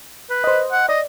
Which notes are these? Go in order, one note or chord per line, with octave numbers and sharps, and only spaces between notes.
B4
C5 D#5
F#5
D5 D#5